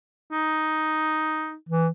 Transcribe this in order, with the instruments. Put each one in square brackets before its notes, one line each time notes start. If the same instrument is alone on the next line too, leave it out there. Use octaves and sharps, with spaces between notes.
[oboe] D#4
[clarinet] E3